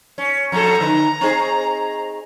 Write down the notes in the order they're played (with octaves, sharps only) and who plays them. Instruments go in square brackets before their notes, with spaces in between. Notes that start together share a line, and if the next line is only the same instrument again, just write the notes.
[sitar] C#4
[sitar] F2 A#2 A4 [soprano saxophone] A#5
[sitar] D3 D#3 B4
C4 D#4 G#4